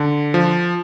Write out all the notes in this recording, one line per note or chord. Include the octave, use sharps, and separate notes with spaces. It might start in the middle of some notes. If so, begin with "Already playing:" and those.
Already playing: D3
F3